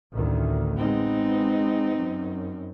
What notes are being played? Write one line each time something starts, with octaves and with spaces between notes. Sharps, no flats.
A1 D2 D#3
G#3 B3 C4 D#4
F#2